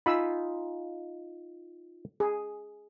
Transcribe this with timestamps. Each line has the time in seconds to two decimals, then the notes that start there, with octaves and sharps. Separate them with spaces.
0.06 D#4 F4 G#5 B5 E6
2.20 G#4